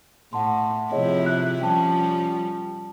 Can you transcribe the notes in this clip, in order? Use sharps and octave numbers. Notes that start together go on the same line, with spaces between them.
A2 F#5 A5 C6
C3 F3 E4 G#4 C#5 D#5
F#6
F3 G3 C#4 G5 A5